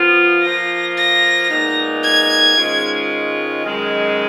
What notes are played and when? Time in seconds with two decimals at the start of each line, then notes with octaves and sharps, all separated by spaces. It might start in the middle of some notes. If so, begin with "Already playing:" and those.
Already playing: F3 B3 F4
0.43 F3 A#3 F4 A#6
0.98 A#6
1.50 A#2 G#3 B3 D#4
2.04 G#6
2.56 G#2 D#3 G#3 C#4 F4
3.63 F#2 D#3 G#3